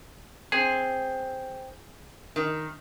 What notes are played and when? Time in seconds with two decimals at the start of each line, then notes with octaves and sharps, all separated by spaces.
0.52 C4 G#4
2.36 D#3